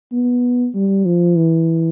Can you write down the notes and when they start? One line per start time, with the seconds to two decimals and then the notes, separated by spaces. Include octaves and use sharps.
0.12 B3
0.75 G3
1.05 F3
1.36 E3